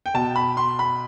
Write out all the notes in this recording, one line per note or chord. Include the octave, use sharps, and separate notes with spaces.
G5
B2 A5
B5
C6
B5